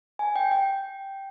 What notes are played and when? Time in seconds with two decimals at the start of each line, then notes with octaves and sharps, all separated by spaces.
0.19 G#5
0.36 G5
0.51 G5